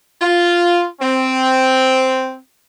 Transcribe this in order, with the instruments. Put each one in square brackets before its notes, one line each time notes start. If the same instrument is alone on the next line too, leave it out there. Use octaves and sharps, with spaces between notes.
[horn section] F4
C4